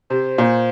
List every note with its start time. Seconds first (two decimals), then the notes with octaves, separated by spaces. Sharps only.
0.10 C3 C5
0.38 A#2